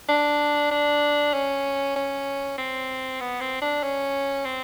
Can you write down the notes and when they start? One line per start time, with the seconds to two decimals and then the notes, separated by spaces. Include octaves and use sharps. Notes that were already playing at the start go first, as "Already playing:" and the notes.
0.08 D4
0.71 D4
1.34 C#4
1.96 C#4
2.58 C4
3.21 B3
3.41 C4
3.62 D4
3.83 C#4
4.45 C4